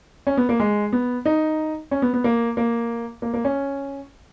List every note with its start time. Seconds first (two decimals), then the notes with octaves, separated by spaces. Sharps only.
0.27 C#4
0.37 B3
0.49 A#3
0.60 G#3
0.93 B3
1.25 D#4
1.91 C#4
2.02 B3
2.13 B3
2.24 A#3
2.57 A#3
3.22 A#3
3.34 A#3
3.45 C#4